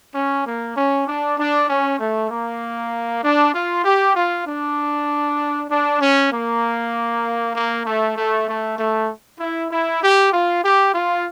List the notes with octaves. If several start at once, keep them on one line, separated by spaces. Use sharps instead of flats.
C#4
A#3
C#4
D4
D4
C#4
A3
A#3
D4
F4
G4
F4
D4
D4
C#4
A#3
A#3
A3
A3
A3
A3
E4
E4
G4
F4
G4
F4